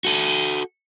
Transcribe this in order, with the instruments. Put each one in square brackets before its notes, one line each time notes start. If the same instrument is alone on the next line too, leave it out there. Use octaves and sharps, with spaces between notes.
[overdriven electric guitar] F#4 A4